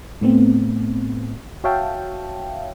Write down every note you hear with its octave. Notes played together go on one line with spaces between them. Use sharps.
A2 A3 B3 C4
F#4 C#5 E5 F5 G5 A5